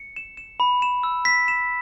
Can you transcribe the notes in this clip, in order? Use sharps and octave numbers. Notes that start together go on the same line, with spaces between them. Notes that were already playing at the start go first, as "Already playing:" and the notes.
Already playing: C#7
E7
E7
B5
E7
E6
B6
E7